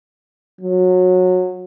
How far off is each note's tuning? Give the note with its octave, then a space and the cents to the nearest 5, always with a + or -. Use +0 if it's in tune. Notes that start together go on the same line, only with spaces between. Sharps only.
F#3 -20